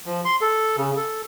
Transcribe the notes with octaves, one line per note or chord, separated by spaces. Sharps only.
F3
C6
A4
C#3
A4